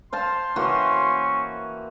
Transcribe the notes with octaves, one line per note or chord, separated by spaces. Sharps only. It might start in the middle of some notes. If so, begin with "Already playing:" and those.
C5 F5 A5 C6
E3 A#3 C#4 F#4